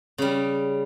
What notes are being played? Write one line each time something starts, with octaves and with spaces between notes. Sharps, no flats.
C#3 G3